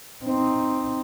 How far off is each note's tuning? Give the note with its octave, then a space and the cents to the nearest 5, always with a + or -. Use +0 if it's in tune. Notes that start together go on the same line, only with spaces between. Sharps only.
C4 +0 D#4 +0